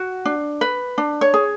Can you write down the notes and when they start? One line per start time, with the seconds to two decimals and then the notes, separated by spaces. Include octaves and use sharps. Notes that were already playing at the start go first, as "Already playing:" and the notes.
Already playing: F#4
0.25 D4
0.61 B4
0.98 D4
1.21 C#5
1.34 G#4